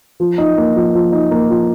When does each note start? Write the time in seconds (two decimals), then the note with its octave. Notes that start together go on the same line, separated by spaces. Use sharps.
0.20 F3
0.38 D#4
0.58 A#3
0.76 F3
0.95 F3
1.12 D#4
1.31 A#3
1.50 F3